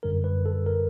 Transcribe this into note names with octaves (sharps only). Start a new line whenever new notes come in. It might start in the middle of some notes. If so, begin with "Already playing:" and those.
G#1 F#2 D3 G3 A#4
B4
A4
A#4